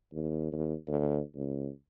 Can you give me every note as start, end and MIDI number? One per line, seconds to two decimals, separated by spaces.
0.13 0.48 39
0.52 0.75 39
0.87 1.21 38
1.35 1.70 37